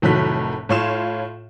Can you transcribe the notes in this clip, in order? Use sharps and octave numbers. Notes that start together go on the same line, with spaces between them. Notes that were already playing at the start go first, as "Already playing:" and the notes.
F1 A2 D#3 F#3 F#6 B6
A2 F4 C#5 F5 C6 E7